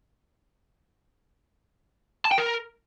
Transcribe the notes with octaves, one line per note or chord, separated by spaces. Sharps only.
A5
G5
A#4